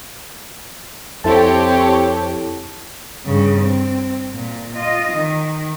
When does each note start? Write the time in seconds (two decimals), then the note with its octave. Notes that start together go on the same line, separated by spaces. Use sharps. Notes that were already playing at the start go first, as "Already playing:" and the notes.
1.24 F2 C4 E4 G4 A4 C#5 A5
3.26 G2 C#3
3.62 C4
4.33 A#2
4.76 F4 D#5
5.12 D#3